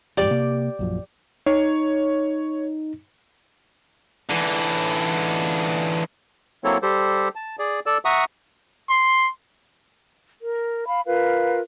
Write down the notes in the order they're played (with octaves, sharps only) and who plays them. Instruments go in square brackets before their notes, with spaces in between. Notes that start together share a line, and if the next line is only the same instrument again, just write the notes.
[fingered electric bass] D1 F2 G#2 [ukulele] G4 D5
[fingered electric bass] C3 A#3
A#1 F#2 F3
[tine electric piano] D#4 [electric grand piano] C#5
[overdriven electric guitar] D3 E3
[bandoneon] F#3 A#3 C4 E4 A4 C#5
G3 G4 A4 C5
A5
G#4 D5
A4 D5 E6
E5 F#5 A#5 C#6 D#6
[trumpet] C6
[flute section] A#4
F5 B5
F4 A#4 B4 F5